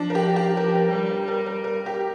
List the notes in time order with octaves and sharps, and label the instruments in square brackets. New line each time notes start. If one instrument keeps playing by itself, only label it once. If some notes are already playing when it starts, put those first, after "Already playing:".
Already playing: [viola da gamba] F3 [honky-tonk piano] D4
[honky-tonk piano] A#4
G4
G4
[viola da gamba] F3 [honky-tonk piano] A#4
[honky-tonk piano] A#4
[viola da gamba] G3 [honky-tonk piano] A#4
[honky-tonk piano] A#4
A#4
A#4
A#4
G4